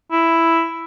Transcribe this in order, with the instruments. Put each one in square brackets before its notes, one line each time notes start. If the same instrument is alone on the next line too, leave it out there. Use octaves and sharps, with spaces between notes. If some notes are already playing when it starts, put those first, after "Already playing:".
[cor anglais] E4